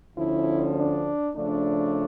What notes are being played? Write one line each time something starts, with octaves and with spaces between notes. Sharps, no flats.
D2 D3 F3 C#4 E4
D4
C#3 F3 A3 D4